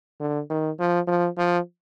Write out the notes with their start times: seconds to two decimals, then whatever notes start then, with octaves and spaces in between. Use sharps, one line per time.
0.20 D3
0.50 D#3
0.79 F3
1.07 F3
1.38 F3